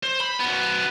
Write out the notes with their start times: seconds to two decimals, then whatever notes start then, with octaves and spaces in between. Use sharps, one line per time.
0.03 C5
0.20 B5
0.40 F#2 B3